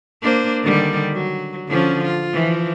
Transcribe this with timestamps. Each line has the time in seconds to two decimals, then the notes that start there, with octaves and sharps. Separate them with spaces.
0.22 A#3 D4 C5
0.63 D3 D#3 G3
1.12 F#3
1.69 D3 F3 C#4
2.04 F4
2.33 E3 F3